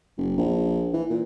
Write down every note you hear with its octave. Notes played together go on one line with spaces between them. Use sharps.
F#1
A#1
E3
A#2